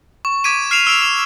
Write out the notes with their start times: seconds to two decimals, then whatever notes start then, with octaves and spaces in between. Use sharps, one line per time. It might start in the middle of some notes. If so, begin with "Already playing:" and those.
0.25 C#6
0.44 D6 G#6 B6 D7 D#7
0.71 F6 C7 D7 E7 F7
0.87 E6 C7 D7 D#7 F7
1.02 E7 F7